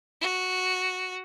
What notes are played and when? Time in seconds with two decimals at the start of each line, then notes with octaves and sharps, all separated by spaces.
0.21 F#4